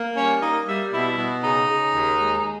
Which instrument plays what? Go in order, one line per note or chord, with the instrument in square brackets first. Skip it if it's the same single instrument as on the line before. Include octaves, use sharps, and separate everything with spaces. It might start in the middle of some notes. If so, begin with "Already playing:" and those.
Already playing: [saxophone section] A#3
G3 C#4 C#5
A#3 D#4 D#5
G3 E5
B2 E4 E5
B2
C#3 D#4 D#5
C#3
D#2
G#3